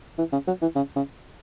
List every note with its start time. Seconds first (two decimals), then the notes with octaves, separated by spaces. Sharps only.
0.18 E3
0.33 C#3
0.47 F#3
0.62 E3
0.76 C#3
0.96 C#3